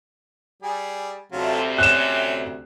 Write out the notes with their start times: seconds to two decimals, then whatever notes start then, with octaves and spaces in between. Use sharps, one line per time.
0.62 G3 G#4
1.32 D2 C3 F#3 A3 F4
1.78 C#4 F#6 E7